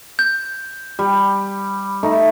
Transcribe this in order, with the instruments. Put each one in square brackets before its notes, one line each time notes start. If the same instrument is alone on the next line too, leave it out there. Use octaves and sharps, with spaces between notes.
[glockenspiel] G6
[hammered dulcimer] G3
A3 D#4